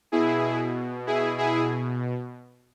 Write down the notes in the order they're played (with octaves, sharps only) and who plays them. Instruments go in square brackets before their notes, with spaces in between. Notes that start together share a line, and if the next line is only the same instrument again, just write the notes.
[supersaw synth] B2 E4 G#4
E4 G#4
E4 G#4